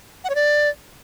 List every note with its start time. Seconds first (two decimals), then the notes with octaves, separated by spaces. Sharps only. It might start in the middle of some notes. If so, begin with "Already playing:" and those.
0.24 F#5
0.30 C#5
0.35 D5